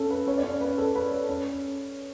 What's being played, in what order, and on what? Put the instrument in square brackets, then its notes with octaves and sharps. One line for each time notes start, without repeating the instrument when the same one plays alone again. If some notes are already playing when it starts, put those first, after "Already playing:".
Already playing: [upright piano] C#4 A4
B4
C#4 C#5
D5
C#4 C#5
B4
A4
B4
B4
C#4 C#5